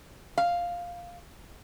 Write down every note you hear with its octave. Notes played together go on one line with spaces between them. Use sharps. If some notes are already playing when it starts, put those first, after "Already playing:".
F5